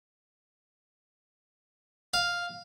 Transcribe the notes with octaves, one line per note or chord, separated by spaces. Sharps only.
F5